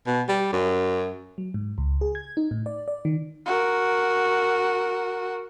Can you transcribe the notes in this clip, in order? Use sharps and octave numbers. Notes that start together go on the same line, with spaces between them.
B2
G3
F#2
F#3
G#2
C#2
G#4
G#6
D#4
A2
D5
D5
D#3
F#4 A#4